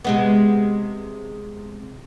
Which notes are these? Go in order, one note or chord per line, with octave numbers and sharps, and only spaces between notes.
C3 G#3 B3